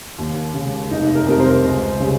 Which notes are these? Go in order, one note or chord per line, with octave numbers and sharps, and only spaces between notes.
D#2
C#3 G#3
F1 D#4
A#4
F2 C3 G3 A#4
C5
C#2
C#3 G3